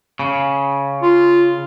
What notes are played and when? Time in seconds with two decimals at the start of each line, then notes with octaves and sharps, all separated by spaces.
0.19 C#3
1.02 F4